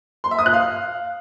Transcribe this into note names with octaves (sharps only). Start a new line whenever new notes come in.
C6
E5
D#6
F#6
F5